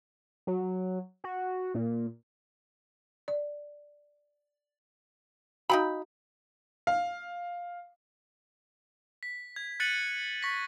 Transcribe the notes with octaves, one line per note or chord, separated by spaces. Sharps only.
F#3
F#4
A#2
D5
D#4 F#4 F5 G5 A#5 B5
F5
B6
G#6
F#6 A6 C#7 D#7 F#7
C#6 A#6 B6